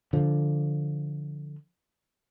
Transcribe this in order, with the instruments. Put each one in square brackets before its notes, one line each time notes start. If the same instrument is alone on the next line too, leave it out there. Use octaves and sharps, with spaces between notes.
[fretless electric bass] D3 F3